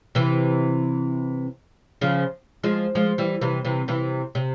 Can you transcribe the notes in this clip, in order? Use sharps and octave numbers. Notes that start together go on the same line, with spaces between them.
C3 E3
C#3 F3
F3 G#3
F3 G#3
E3 G3
C3 E3
C3 E3
C3 E3
C3